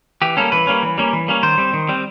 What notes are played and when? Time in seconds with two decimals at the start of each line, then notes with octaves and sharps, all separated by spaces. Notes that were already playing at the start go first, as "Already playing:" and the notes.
0.22 E3 G4
0.37 G3 A#3 C#4 A4
0.52 E3 B4
0.67 G3 A#3 C#4
0.83 E3
0.98 G3 A#3 C#4
1.13 E3
1.28 G3 A#3 C#4
1.43 D#3 C5
1.58 G3 C4
1.73 D#3
1.88 G3 C4